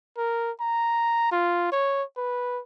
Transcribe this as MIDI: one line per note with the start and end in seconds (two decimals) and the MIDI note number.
0.17 0.51 70
0.61 1.28 82
1.32 1.67 65
1.72 2.03 73
2.17 2.61 71